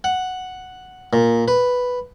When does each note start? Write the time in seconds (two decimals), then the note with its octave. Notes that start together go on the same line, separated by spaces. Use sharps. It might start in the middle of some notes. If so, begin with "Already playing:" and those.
0.04 F#5
1.13 A#2
1.48 B4